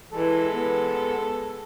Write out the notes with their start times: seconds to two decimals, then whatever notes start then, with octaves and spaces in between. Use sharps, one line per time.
0.13 E3 G#3 A4
0.53 B3